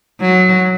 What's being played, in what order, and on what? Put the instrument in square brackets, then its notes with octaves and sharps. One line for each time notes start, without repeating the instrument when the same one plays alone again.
[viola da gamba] F#3